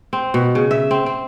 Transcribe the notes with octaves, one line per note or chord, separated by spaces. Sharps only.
C4
B2
C#3
E5
C4
C4